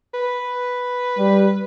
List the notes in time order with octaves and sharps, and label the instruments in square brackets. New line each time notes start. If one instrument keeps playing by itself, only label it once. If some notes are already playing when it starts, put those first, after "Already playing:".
[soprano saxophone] B4
[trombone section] G3